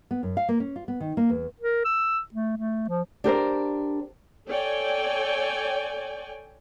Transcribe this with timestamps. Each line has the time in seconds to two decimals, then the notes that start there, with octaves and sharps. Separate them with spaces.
0.11 B3
0.23 F#2
0.37 F5
0.49 A#3
0.60 C#4
0.76 F4
0.88 B3
1.00 D#3
1.17 A#3
1.29 E2
1.60 A#4
1.85 E6
2.34 A3
2.57 A3
2.88 F3
3.24 D4 G4 A#4 C5
4.49 A4 C#5 D5 G5 G#5